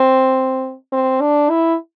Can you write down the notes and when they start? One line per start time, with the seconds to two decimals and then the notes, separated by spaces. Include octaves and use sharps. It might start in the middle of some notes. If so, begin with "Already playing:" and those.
Already playing: C4
0.92 C4
1.21 D4
1.50 E4